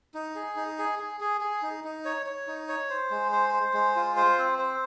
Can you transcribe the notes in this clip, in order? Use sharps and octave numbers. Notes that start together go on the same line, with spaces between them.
D#4
G#4
D#4
G#4
G#4
G#4
G#4
D#4
D#4
C#5
C#5
D#4
C#5
C5
G#3
C5
C5
G#3
F4
C5
C4
C5